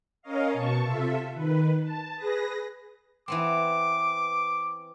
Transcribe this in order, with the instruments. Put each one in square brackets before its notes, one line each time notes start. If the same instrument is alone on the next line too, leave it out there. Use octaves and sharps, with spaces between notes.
[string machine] C#4 A#4 C#5 D#5 F5
B2 A5 C#6
C3 F4 A4 E5
D#3 B4
A5
G#4 B4 A#6
[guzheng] E3 B3 C4 [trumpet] D6